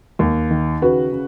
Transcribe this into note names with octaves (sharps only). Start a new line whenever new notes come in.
D#2
D#3
C#3 F#4 B4
C#3